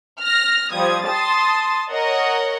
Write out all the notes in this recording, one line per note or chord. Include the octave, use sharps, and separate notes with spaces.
F6 A#6
F3 G3 D#6 G#6
A5 C6 D#6 A6
A#4 C#5 D#5 F#5